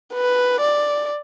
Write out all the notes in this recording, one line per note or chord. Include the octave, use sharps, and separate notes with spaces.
B4
D5